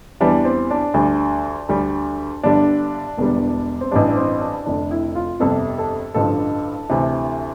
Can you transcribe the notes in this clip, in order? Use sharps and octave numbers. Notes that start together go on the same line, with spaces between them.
E2 E3 G3 D4
C4
D4
D2 D3 G3
D2 D3 G3
G1 G2 D3 G3 D4
E1 E2 D3 G3
C4
A1 G2 E3 G3 D4
C4
D4
F1 F2 D3 D4
E4
F4
G1 F2 C3 G3 A4
A4
A1 G2 D3 F3 A4
D2 C3 E3